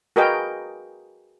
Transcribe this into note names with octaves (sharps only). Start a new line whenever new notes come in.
F#4 G#4 A#4 B4 D#5 G5